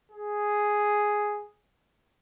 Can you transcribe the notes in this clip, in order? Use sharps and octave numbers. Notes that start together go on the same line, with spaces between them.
G#4